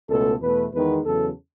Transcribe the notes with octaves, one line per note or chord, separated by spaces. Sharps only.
C#2 B2 A3 A4
E2 B2 A3 B4
E2 D#3 G#3 B3 B4
E2 C#3 F#3 A4